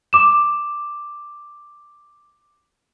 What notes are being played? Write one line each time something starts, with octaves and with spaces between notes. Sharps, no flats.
D6 E7